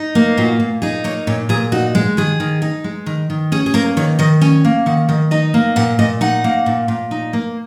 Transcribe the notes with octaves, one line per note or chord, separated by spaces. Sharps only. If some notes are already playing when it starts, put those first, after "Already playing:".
Already playing: D#4
A#3
A#2 F#4
A#2
D#4 G#4
A#3 C#5
A#2 C#5
A#2 G#4
D#4 F#4
G#3
D#3 G#4
D#3
D#4
G#3
D#3
D#3
C#4 G#4
G#4
A#3 A#4
D#3 C#5
D#3 D#5
C#4 G#5
A#3
D#3 F#5
D#3 D#5
D#4 D#5
A#3
A#2 F#5
A#2 D#5
D#4 F#5
A#3
A#2
A#2
D#4
A#3